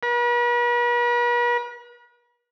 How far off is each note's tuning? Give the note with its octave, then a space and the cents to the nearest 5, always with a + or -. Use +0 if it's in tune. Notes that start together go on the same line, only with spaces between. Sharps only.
B4 -45